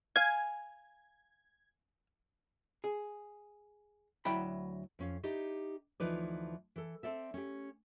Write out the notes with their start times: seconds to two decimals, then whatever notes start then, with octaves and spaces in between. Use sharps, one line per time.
0.16 F5 G#5 G#6
2.84 G#4
4.25 D2 F#3 E4 G5 B5
4.99 F2 C#4 F5
5.23 D#4 E4 G4 D5 D#5
6.00 D2 E3 F3 D#4 B4 D5
6.76 E3 A4
7.03 C4 A4 D5 E5
7.34 C#4 G4